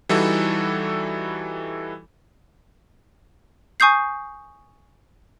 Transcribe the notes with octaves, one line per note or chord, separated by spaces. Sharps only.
E3 G3 D#4 E4 F#4 A4
G#5 C#6 D#6 G6 C7